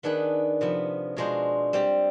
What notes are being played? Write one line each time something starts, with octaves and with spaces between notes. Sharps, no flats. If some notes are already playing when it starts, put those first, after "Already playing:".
D#3 B3 D4 G#4 B4
C3 F3 B3
B2 G#3 D4 F4 C5
G3 C4 G4